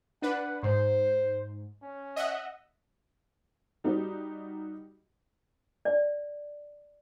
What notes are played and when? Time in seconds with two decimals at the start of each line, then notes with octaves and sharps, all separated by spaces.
0.22 D4 B4 F#5
0.63 G#2 C5
1.82 C#4
2.16 D#5 E5 F#5
3.84 G3 D#4 F#4 G4
5.85 D5